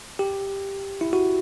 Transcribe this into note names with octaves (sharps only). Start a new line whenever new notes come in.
G4
E4
F#4